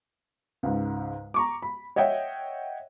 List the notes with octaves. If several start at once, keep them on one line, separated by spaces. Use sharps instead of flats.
C#2 G#2
A#5 C#6 D6
B5
C#5 D#5 E5 F#5 G5